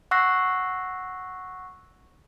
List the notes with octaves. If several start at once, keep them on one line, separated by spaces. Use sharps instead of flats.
F#5 C#6 E6 F#6 A#6 C7